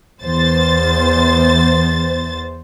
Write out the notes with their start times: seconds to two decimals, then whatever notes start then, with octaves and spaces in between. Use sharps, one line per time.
0.23 E2 C5 A6